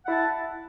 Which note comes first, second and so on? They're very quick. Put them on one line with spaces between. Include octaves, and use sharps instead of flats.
F#5 E4 A5